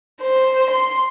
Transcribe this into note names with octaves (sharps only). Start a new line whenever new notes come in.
C5
C6